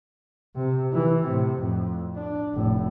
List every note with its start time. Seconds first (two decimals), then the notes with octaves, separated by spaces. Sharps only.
0.56 C3
0.93 E3
1.23 A2 C3
1.60 F2 A2
2.16 D4
2.54 F1 A2